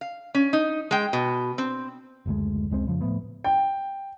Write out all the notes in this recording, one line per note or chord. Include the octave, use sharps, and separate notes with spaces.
F5
C#4
D#4
G#3 G5
B2
C4
F#1 D2 G#3
F1 C#2 G#3 C4
F2 C#3 E3 F3
A2 F3 A3 B3
G5